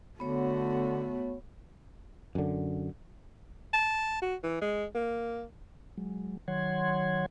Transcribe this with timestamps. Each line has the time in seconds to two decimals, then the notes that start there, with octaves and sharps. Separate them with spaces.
0.20 D3 A3 B3 F#4 C#5
2.35 F#2 D3
3.73 A5
4.22 F#4
4.43 E3
4.61 G#3
4.95 A#3
5.98 F#3 G#3
6.48 D#3 F#3 C#5 F#5 C6 G#6